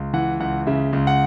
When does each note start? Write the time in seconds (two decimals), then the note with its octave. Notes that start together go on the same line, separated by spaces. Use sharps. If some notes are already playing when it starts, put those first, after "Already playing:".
Already playing: C#2
0.14 E3 F#5
0.40 C#2 F#5
0.67 C#3 E5
0.93 C#2
1.07 F#5